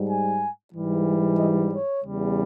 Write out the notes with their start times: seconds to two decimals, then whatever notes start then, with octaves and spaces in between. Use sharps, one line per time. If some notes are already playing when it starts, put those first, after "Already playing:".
Already playing: G#2 G3
0.08 G#5
0.73 G#2 E3 G3
1.39 D#5
1.71 C#5
2.04 E2 C#3 G3